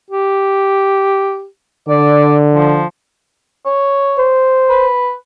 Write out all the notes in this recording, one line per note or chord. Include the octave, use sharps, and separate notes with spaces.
G4
D3 D5
F3
C#5
C5
B4